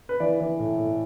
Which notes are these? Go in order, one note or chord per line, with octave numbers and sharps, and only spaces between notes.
B4
E3 D5
E3
A2
A2